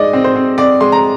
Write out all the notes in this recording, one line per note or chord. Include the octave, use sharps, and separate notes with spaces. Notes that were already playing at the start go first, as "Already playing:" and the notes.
Already playing: G#3 D#4 D5 D#5
C4
C5
C4
C4 D5
G#3 C6
A#5